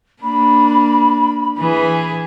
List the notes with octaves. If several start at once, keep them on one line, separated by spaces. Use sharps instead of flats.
A#3 D4 B5
E3 G#4